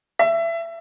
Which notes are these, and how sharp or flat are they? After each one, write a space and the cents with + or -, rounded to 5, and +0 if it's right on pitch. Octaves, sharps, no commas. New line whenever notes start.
E5 +20